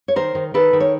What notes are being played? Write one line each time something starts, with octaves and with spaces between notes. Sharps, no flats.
C#5
D#3 A#4 C5
D#3
D#3 A4 B4
D#3
C#5